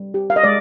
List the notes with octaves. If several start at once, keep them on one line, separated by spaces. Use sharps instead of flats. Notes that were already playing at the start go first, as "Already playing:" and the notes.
Already playing: G3
G4
F5
D#5
G#3 D5